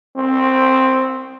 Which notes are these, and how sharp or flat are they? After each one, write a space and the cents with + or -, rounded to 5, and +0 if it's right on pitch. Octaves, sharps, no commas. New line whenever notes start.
C4 +5